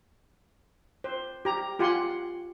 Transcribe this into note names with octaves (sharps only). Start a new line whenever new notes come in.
C5
G4 A#5
F4 G4 F#5 G#5 C6